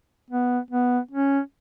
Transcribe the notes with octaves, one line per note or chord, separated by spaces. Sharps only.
B3
B3
C#4